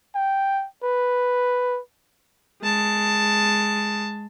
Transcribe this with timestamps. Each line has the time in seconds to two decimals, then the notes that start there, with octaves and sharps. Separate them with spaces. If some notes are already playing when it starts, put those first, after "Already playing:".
0.15 G5
0.83 B4
2.62 G#3 A5